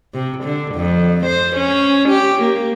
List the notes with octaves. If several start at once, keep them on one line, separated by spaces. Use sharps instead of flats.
C3
D3
F2
C5
C#4
G4
A#3